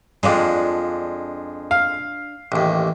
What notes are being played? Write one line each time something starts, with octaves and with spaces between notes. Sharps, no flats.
F2 G#3 D4 F4 D5
F5
A1 D#2